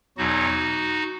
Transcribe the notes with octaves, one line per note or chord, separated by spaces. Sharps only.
E2 B2 F#3 D#4 F#4